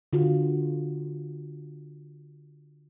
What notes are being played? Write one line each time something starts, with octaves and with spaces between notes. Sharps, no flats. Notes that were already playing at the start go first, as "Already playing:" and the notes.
D3 F4 F#4